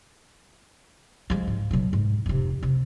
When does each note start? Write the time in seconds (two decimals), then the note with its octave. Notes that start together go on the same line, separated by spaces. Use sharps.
1.30 F3 G#3
1.48 G#2
1.71 B2 F#3
1.93 G#2
2.26 F1 C3
2.63 C3